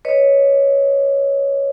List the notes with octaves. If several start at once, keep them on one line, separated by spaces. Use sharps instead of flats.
B4 C#5 D#5